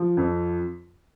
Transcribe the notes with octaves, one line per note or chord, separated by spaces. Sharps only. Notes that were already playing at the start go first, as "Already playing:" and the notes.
Already playing: F3
F2